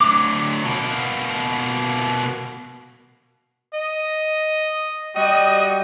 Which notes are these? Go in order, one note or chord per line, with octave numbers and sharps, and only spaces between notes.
D2 F#3 D6
B2 A#3
D#5
G3 F#4 D#5 D#6